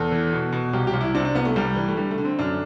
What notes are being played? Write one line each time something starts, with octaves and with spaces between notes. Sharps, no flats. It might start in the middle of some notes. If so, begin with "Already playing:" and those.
Already playing: E2 A4
E3
B2
B2
C2 G4
G4
C2
E4
C3 D4
D4
C2 B3
A3
C2 G3
E3
A3
D3 G3
A3
D3
C4
F#2 D4